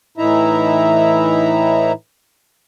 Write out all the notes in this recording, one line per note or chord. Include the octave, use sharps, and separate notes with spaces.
A2 E3 D#4 E4 E5 A#5